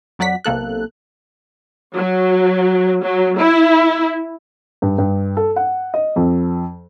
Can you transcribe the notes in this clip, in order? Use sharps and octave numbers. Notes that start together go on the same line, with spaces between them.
F2 F#3 D5 F#5 B6
B1 C3 A#3 A4 F#6
F#3
F#3
E4
G2
G2
A4
F#5
D#5
F2